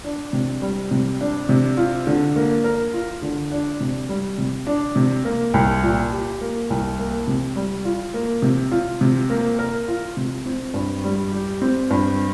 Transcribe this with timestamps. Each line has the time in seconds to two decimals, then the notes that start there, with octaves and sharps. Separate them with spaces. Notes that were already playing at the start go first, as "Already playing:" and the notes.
0.04 D4
0.33 C3
0.62 G3
0.91 C3
1.21 D4
1.49 C3
1.77 F4
2.07 D3
2.36 A#3
2.64 A#4
2.94 F4
3.22 D3
3.52 D4
3.80 C3
4.09 G3
4.38 C3
4.67 D4
4.96 C3
5.25 A#3
5.54 C2
5.83 A#2
6.12 G4
6.41 A#3
6.70 C2
6.99 A#3
7.27 C3
7.56 G3
7.85 F4
8.14 A#3
8.42 C3
8.71 F4
9.01 C3
9.30 A#3
9.59 A#4
9.88 F4
10.17 C3
10.46 C4
10.74 G2
11.04 G3
11.32 G4
11.62 C4
11.90 G2